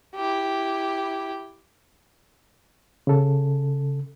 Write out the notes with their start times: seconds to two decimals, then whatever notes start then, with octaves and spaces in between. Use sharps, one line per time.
0.16 E4 G4
3.07 C#3 A4